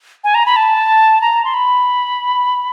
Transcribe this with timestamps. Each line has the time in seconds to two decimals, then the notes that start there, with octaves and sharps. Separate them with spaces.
0.24 G#5
0.35 A#5
0.46 B5
0.56 A5
1.21 A#5
1.45 C6
1.54 B5